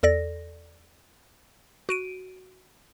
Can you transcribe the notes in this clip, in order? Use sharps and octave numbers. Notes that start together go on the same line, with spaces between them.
E2 A4 D5 A#6
F#4 D7 D#7